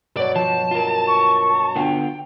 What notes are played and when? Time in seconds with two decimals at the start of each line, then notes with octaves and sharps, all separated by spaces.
0.17 G2 B2 F#3 D5
0.36 F3 A5
0.71 F4 A#4
1.07 C#6
1.76 D3 B3 F4 G5